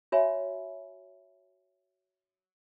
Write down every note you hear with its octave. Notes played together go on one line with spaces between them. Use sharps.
F#4 C#5 E5 G#5 B5